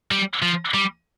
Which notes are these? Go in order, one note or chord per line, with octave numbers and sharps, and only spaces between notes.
G3
F3
G3